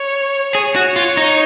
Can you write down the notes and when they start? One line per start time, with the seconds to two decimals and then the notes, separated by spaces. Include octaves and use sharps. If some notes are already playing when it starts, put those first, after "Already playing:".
Already playing: C#5
0.55 G#4 C#5
0.76 F#4
0.96 F4
1.17 D#4